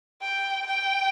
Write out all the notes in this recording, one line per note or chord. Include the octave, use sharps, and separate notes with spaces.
G5
G5